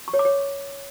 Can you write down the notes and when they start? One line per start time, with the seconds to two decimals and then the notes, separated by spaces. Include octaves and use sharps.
0.08 C#6
0.14 C#5
0.19 D6
0.25 C#5